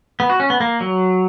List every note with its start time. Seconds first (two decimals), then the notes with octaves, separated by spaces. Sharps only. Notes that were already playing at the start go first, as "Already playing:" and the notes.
0.20 B3
0.30 F#4
0.40 C#4
0.50 B3
0.60 A#3
0.81 F#3